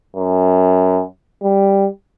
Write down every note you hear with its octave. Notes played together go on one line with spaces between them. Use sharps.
F#2
G3